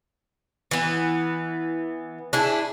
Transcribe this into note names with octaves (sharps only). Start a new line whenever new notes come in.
E3 B3
D4 E4 G#4